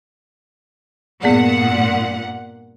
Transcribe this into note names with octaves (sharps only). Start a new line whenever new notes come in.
G2 A#2 B3 G#4 D5 F#5